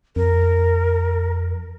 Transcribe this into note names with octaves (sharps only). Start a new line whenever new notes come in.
F2 A#4